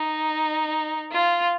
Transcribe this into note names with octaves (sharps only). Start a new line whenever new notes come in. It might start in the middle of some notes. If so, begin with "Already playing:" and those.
Already playing: D#4
F4